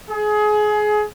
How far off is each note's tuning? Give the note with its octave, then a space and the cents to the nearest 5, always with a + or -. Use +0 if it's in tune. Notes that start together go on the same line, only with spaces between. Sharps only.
G#4 +25